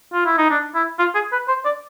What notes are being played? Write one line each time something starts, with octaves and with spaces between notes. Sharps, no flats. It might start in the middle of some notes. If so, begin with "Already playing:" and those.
F4
E4
D#4
D4
E4
F4
G#4
B4
C5
D5